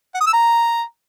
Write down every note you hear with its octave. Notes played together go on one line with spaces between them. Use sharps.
F#5
D#6
E6
A#5